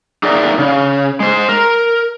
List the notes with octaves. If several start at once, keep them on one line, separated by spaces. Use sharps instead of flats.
D#4 G#4 A#4 D5 E5
C#3
G#3 C5
A#4